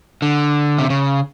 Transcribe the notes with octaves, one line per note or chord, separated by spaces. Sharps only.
D3
C3
C#3